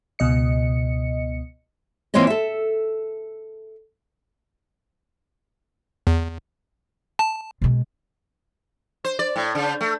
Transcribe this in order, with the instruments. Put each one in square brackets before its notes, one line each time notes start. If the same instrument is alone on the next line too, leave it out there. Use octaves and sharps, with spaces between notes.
[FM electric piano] C#2 B2 D#5 C#7
[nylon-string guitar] E3 A#3 C4 F4 C#5 D#5
A4 E5
[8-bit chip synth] E2
A5
[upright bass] B2 G#3
[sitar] C5
D5
A2
C#3
A3